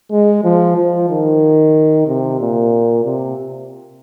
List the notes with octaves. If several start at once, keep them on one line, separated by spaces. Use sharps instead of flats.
G#3
F3
F3
D#3
C3
A#2
C3